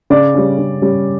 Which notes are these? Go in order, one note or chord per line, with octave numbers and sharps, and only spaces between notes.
C#3 D5
G3 C#4
C#3
G3 C#4